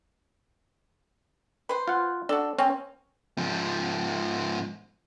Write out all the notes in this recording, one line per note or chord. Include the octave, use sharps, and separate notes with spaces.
B4 C5
F4 F#5
D4 F#4 A4
C4 C#4
G#2 F3